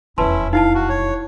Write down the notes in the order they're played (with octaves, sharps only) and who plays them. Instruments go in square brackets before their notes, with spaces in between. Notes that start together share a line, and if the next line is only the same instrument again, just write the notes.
[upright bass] E1 F2 [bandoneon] C#4 E4 [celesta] B4 A5 C6
[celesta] D#4 E4 A5 [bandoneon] F5
[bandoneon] F#4
C#5